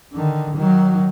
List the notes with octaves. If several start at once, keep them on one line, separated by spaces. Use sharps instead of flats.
D3 D#3
D#3 F#3